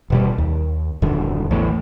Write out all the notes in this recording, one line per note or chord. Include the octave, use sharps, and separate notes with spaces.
D#1 B2 G3
D#2
D#1 F#2 D3
A1 E2 A2